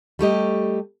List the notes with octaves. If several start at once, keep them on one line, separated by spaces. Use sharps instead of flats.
G3 A3 G4 D#5